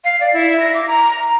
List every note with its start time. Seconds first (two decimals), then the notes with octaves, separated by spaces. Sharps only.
0.04 F5
0.20 D5
0.33 E4
0.60 A#6
0.74 D6
0.87 A#5